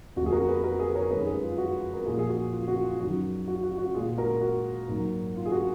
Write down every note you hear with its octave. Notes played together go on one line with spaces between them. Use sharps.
F2 F3 A#3 F#4
G#4
F#4 A#4
G#4 B4
F#4 A#4
G#4 B4
A#4 C#5
F#2 D#3 G#3 G#4 B4
G#4 B4
F4
F#4
A#4
A#2 F3 A#3 F4 G#4
G#4
F#4
F4
F#4
F4
F#2 D#3 F#3 F#4
F#4
F#4
F#4
A#2 G#3 F4 G#4
F#4 A#4
F#4
G#2 F#3 A#3
F4
G#4
F#4